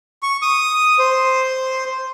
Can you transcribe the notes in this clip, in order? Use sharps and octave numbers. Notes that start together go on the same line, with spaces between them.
C#6
D#6
C5